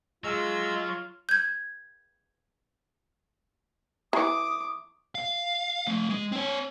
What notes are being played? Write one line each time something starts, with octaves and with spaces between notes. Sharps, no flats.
F#3 G#3 F4 E6
G6 G#6
E3 D6 D#6
F5
A3 C4
G#3
C4 C#5